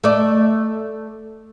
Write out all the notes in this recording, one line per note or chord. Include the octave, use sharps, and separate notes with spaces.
A3 D5